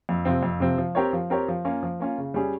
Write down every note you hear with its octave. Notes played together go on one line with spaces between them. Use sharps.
F2
C3 F3 C4
F2
C3 F3 C4
F3
C4 G4 A#4 C#5
F3
C4 G4 A#4 C#5
F3
A#3 C#4 F4
F3
A#3 C#4 F4
C#3
G3 C#4 G#4